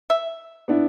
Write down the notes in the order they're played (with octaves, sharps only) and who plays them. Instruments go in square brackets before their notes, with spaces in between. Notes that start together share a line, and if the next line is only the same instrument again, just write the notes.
[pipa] E5
[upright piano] B3 D4 E4